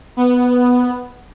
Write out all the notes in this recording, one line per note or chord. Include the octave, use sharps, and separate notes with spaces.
B3